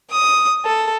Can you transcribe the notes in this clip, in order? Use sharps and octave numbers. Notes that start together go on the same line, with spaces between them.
D#6
A4